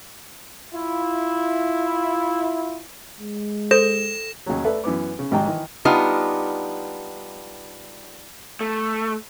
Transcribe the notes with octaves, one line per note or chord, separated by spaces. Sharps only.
E4 F4
G#3
A4 C5 A#6 E7
D#2 C#3 F#3
A3 A4 B4 D5 E5
F#2 E3 B3 D6
C#3
G#1 G#2 D#3 G3 G5 A#5
D#3 E3
G3 B3 D4 D#4 F4
A3